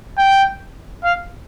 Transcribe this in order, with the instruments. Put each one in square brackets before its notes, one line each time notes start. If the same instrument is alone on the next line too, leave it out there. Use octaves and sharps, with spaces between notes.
[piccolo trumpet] G5
F5